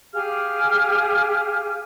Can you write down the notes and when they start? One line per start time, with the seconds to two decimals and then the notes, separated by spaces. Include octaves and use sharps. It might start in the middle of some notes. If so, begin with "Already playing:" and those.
0.12 G4 G#4 F5 F6